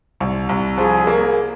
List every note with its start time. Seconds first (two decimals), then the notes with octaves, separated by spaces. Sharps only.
0.20 C2
0.49 C2
0.78 F3 G#4
1.07 A#3